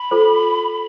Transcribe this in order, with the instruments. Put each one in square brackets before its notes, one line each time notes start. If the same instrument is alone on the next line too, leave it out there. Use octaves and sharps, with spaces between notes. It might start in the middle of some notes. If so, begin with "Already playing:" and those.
Already playing: [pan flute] B5
[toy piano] F4 A4 C5